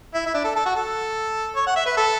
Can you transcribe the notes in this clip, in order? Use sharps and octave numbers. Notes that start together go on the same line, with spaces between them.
E4
E4
D4
A4
A4
F#4
A4
C#5
F#5
E5
B4
A4